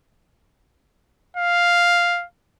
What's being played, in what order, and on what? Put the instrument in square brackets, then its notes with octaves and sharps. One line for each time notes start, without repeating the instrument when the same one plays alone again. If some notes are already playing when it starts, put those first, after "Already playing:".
[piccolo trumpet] F5